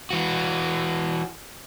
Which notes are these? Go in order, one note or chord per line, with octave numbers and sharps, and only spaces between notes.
E3 F#4